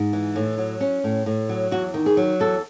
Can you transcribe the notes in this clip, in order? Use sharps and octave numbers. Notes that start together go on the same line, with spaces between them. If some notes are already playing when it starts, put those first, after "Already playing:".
Already playing: G#2
E3
A2
F#3
C#4
A2
A2
F#3
E2 F#4
D#3
G#4
F#3
E2 A4